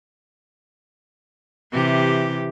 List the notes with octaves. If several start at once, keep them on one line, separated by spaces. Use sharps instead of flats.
C3 E3 G4